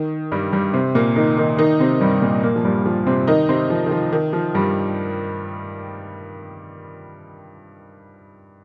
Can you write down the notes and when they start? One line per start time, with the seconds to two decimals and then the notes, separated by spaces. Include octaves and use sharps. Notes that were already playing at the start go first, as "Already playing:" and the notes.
Already playing: D#3
0.32 G2 G3
0.53 G2 G3
0.73 C3 C4
0.95 A#2 A#3
1.16 D#3 D#4
1.37 D#3 D#4
1.58 D#3 D#4
1.80 C3 C4
2.01 G2 G3
2.21 A#2 A#3
2.43 A#2 A#3
2.56 F3
2.64 G2 G3
2.86 F3
3.06 C3 C4
3.27 D#3 D#4
3.49 C3 C4
3.70 F3
3.86 D#3
3.91 F3
4.12 D#3
4.33 F3
4.54 G2 G3